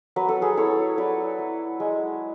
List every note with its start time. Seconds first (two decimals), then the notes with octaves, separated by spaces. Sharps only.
0.16 F#3 B4
0.29 A4
0.42 G#4 B4
0.57 E4 A4 C#5
0.98 F#3 B4 D5
1.39 E4
1.80 G#3